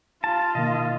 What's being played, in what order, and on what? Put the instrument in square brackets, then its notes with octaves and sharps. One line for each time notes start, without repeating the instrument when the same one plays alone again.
[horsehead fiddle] F4 [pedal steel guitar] A5
[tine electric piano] B2 D#3 A#3 [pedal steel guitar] D#5